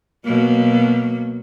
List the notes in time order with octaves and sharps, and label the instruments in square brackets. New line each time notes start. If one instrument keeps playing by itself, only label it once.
[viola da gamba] B2 F#3 A#3